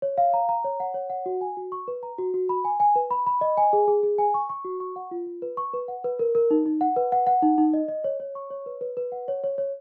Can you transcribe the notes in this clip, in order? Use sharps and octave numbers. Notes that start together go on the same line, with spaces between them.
C#5
F5
A#5
A#5
C#5
F#5
C#5
F#5
F#4
G#5
F#4
C#6
B4
A#5
F#4
F#4
B5
G#5
G#5
B4
B5
B5
D#5
G#5
G#4
G#4
G#4
G#5
C#6
C#6
F#4
C#6
F#5
F4
F4
B4
C#6
B4
F#5
B4
A#4
A#4
D#4
D#4
F#5
B4
F#5
F#5
D#4
D#4
D#5
D#5
C#5
C#5
C#6
C#5
B4
B4
B4
F#5
C#5
C#5
C#5